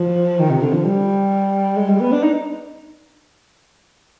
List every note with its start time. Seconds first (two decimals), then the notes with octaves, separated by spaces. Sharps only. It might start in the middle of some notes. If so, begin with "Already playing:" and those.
Already playing: F3
0.39 D#3
0.50 C3
0.62 D3
0.73 F3
0.85 G3
1.77 G#3
1.89 G3
2.00 B3
2.12 D4
2.23 D#4